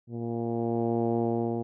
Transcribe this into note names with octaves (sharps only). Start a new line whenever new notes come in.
A#2